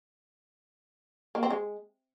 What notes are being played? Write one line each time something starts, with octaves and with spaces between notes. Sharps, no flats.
A#3
C4
G#3